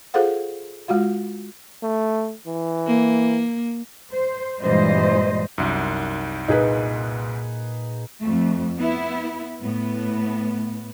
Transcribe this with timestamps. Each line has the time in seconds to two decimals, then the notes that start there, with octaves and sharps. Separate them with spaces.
0.14 F4 G#4 A4 C5 F5 F#5
0.88 G#3 F4 F#4 F5
1.83 A3
2.47 E3
2.87 A#3
4.11 C5
4.61 G2 A#2 E3 G#3 C5 D#5
5.58 C2 F#2 D#4
6.48 A#2 D#4 G#4 B4
8.21 F2 A3
8.79 B3 E4
9.62 A2 B3